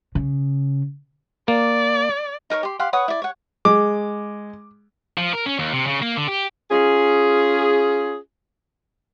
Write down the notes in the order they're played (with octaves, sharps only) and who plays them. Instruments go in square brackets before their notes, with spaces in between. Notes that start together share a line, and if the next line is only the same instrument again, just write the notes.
[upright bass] C#3
[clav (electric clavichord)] A#3 [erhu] D5
[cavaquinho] D#4 A#4 B4 C#5
G4 C6
G4 F5 F#5 C6
B4 C#5 F#5 D#6
E4 D5
C#5 F#5
[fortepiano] G#3 [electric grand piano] D6
[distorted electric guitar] F3
A#4
C#4
D#2
C3
C#3
A#3
D3
G4
[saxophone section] C#4 F4 G#4